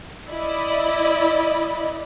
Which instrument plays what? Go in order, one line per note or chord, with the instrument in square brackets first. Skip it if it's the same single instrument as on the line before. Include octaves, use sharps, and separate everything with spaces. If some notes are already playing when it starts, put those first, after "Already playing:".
[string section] E4 D5 D#5 B5